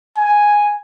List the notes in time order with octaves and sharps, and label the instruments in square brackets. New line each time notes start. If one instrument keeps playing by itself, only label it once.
[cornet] G#5